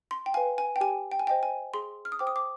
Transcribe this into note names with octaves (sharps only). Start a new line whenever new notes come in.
C6
G5
B4 F5 G#5
G#5
G5
G4 G#5
G5
G#5
C5 D#5 G5
G#5
G#4 C6
F6
D#6
C5 G5 D6
D#6
D6